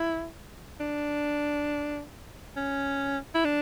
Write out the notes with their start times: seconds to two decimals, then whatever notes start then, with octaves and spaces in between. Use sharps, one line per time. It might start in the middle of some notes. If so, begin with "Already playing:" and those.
Already playing: E4
0.80 D4
2.56 C#4
3.35 E4
3.45 D4